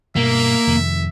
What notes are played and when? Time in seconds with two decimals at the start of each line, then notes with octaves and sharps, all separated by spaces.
0.16 G2 B2 A#3 E5
0.67 F2 C3 D#3